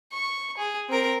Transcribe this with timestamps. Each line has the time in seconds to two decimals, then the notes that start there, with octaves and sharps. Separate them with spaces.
0.12 C#6
0.57 G#4
0.89 C4 A#4